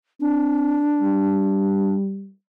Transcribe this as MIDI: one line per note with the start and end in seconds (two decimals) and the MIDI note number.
0.20 0.80 60
0.20 1.94 62
1.01 2.32 55